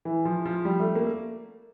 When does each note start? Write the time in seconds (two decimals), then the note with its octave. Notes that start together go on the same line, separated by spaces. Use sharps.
0.05 E3
0.25 F3
0.45 F3
0.65 G3
0.80 A3
0.95 A#3